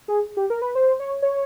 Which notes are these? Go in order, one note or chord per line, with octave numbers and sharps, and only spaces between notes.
G#4
G4
A#4
B4
C5
C#5
C#5